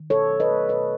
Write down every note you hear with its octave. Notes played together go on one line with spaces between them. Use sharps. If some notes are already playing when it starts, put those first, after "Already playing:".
Already playing: D#3
B2 A4 C#5
F#3
B4 D#5
A3
B2 B4 D#5